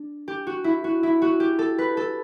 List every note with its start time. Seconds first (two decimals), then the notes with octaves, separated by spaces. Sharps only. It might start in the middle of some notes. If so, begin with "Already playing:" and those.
Already playing: D4
0.28 G4
0.47 F#4
0.64 E4
0.84 F#4
1.03 E4
1.22 F#4
1.40 G4
1.59 A4
1.78 B4
1.97 A4